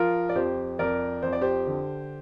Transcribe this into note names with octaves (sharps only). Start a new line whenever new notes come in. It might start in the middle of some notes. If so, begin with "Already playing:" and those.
Already playing: F3 F4 A#4
D5
F2 G4 C5
F2 A#4 D5
F2 C5
D5
G4 C5
D3